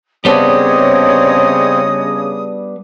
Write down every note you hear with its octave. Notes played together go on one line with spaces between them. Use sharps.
C#3 G3 B3 C4 D4 C#5 D#5 D#6